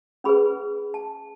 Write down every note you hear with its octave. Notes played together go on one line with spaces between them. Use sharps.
C#4 G#4 B4 B5
A5